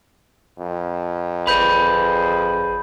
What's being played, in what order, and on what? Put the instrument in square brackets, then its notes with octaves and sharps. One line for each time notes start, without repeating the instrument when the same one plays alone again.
[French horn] F2
[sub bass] G1 [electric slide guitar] G#4 B4 [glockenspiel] B5 G6